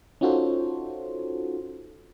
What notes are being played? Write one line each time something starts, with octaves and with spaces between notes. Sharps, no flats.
C#4 D#4 F4 F#4 A4 C5